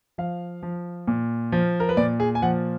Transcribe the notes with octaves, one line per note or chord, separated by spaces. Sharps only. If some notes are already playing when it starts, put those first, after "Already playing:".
F3 F5
F3
A#2
F3
A#4
B4
A#2 D5
G#4
G#5
F3 F#5